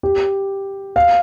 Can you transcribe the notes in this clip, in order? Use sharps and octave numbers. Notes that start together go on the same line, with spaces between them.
G4
F5